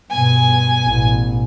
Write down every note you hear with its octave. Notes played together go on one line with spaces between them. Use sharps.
G2 B2 G#5
A1 B2